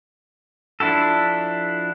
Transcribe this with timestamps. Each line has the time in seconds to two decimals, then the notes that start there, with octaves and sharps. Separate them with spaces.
0.80 F3 D4 E4 F#4 A4